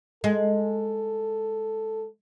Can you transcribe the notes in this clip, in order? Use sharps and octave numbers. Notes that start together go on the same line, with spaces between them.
G#3 A4